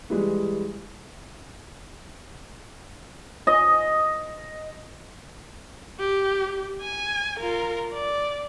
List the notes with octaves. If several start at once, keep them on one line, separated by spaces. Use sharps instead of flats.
E3 G3 G#3
D#5
G4
G#5
F4 A#4
D5